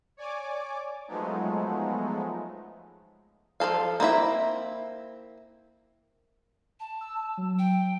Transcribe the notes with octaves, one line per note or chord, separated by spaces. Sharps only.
C#5 D5 G#5 D6
F3 F#3 G#3 A3 B3 D#4
F3 F#3 A4 F5
A#3 C4 E4 E5
A5
E6
F#3
G5